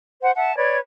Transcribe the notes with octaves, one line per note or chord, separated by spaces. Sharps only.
C5 F#5
E5 F#5 A5
B4 C#5 D5 G#6